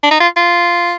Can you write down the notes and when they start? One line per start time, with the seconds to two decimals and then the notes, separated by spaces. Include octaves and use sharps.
0.03 D4
0.11 D#4
0.20 F4
0.36 F4